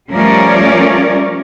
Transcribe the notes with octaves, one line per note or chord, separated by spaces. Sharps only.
F3 G3 A3 C#4 A#4 D5